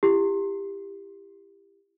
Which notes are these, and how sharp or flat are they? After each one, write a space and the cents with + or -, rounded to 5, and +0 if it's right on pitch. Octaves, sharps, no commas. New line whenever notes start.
E4 +35 G4 +20